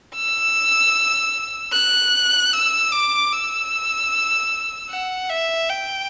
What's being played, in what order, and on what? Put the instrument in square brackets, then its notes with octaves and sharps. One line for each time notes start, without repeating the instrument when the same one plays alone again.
[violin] E6
F#6
E6
D6
E6
F#5
E5
G5